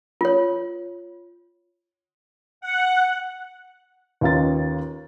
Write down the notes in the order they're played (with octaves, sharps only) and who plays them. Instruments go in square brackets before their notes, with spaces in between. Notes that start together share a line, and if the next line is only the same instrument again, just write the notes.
[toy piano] F4 C#5
[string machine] F#5
[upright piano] D#2 C#4 D#4 F4 B4 A6